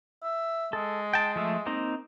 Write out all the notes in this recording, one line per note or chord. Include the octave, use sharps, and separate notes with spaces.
E5
G#3 A4
G5 A5
F3 A3 E5
A#3 C4 D#4